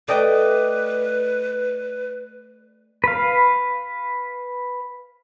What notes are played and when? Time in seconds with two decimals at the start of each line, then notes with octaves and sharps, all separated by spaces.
0.08 A3 B4 D5 D#5 G5
3.04 B4 F5